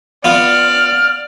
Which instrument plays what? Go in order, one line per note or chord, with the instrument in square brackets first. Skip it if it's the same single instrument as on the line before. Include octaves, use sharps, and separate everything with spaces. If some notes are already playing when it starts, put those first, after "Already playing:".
[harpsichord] B3 F4 [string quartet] D5 [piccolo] F6